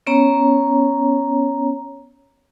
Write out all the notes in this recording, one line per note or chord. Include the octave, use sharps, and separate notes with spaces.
B3 C#4 C#5 A#5